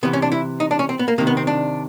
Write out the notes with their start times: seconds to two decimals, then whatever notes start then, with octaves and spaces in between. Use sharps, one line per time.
0.03 C3 E3 B3
0.13 C#4
0.22 D4
0.32 E4
0.60 D#4
0.71 D4
0.79 C#4
0.89 C4
0.99 B3
1.08 A#3
1.18 C3 D#3 A#3
1.27 B3
1.37 C4
1.47 D4